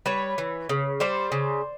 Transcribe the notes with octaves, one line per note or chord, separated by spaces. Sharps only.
G3 B4 C#5
E3
C#3
G3 C5 D5
C#3